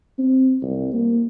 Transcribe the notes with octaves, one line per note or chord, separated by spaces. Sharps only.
C4
C2
A#3